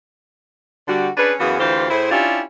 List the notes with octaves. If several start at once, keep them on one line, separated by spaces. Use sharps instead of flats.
D3 G3 F#4
C#4 D4 G#4 B4
F#2 E3 B3 F#4 G#4 F5
D2 E3 F4 G4 C5
A2 E4 G#4 C5
C#4 D4 E4 F4 G4